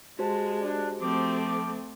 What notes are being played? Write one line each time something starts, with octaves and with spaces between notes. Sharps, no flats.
G#3 F#4 G4 C5 A5
D4
F3 A3 C4 D6